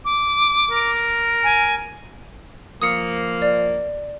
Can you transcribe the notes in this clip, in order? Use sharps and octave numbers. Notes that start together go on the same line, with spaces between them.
D6
A#4
G#5
F3 A#3 D#6 C#7
D5